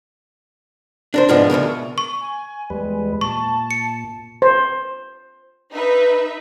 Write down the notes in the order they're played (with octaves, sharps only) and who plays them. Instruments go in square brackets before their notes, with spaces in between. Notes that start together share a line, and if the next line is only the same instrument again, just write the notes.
[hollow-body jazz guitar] D4 A#4 C5
G#2 B2 F3 G#3 B3 D4
D2 G#2 B2 A#4
[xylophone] C#6
[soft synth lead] G#5
[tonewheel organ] E2 G3 B4 [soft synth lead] G#3
[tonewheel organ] A#2 [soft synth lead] A5 [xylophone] C#6
[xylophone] C#7
[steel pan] C5
[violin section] D#4 B4 E5